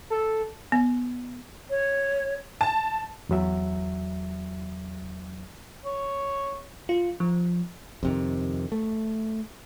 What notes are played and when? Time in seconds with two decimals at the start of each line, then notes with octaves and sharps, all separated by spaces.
0.10 A4
0.72 B3
1.70 C#5
2.61 A5
3.29 E2 F#3 E5
5.85 C#5
6.89 F4
7.20 F3
8.03 F2 C3 D#3
8.72 A3